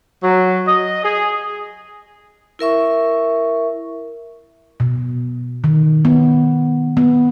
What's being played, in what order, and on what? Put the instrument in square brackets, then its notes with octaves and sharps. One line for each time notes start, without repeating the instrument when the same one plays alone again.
[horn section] F#3
D#5
G#4
[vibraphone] E4 A#4 E5 C#6
[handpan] B2
D#3
B3
B3